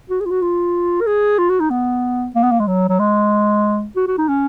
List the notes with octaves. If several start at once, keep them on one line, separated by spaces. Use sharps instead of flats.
F#4
G#4
F4
F#4
F4
A#4
G#4
F4
F#4
D#4
B3
A#3
B3
A#3
G#3
F#3
F#3
G#3
F#4
F#4
D#4
C#4